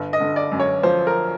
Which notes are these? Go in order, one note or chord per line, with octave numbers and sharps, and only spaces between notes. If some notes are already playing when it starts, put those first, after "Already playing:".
Already playing: G1
D#5
D3
D5
F#2
C#5
F3 C5
A#4